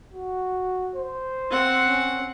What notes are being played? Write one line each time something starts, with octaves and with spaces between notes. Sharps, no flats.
F#4
C5
C4 F#5
C#4